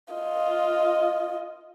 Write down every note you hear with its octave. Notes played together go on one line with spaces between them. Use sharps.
F4 D#5